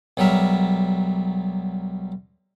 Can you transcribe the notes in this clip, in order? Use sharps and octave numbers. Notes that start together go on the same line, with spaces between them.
B1 F#3 G3 A#4 E5